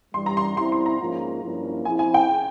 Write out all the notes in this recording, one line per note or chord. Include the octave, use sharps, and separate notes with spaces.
G2 E3 G3 C6
A#5
C6
G3 C4 E4 C6
C6
A#5
G#2 F3 A#3 C#4 F4
G2 F3 A#3 C#4 E4
F3 C4 E4 G#4 G#5
G#5
G5